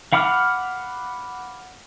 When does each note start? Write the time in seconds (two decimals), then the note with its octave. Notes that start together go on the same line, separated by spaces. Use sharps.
0.13 F5 F#5 B5 D6 F6